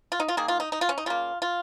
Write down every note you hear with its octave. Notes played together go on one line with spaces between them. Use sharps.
F4
D#4
F4
D#3 A#3 G#4
F4
D#4
D#4
F4
C#4
D#4
C#3 A#3 F4
F4